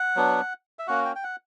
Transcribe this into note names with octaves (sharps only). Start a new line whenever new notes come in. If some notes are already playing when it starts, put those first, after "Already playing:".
Already playing: F#5
F#3 B3 D4
E5
A#3 C#4 F#4 F#5
G5
G5
F#5